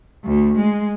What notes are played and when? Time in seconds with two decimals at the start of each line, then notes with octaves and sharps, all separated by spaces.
0.25 D2
0.57 G#3